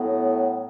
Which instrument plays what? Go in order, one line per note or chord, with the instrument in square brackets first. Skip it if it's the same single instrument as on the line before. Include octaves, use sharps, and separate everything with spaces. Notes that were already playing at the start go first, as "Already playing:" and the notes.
Already playing: [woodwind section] A2 F#3 B3